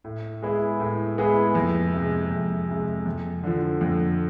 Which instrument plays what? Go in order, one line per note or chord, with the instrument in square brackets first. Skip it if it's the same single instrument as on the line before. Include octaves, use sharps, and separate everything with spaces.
[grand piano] A2
G#3 B3 E4 G#4
A2
G#3 B3 E4 G#4
F2
C3 G#3
F2
C3 G#3
F2
D3 F3
F2